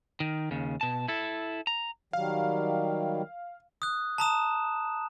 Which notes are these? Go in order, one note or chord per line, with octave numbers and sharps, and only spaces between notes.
D#3
D#2 C#3
B2 A5
E4 A4
A#5
D#3 F#3 G3 F5
D#6 F#6
A5 A#5 D#6 E7